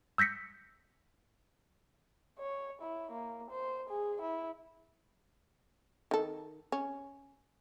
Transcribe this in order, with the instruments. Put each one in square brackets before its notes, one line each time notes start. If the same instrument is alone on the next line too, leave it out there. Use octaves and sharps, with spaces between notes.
[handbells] E6 G6 A#6 B6 C#7
[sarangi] C#5
E4
A#3
C5
G#4
E4
[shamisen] D#3 A4
C#4